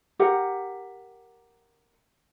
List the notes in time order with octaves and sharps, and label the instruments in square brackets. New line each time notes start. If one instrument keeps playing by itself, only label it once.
[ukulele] G4 A#4 F#5